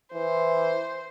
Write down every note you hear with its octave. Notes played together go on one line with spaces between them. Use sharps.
E3 C5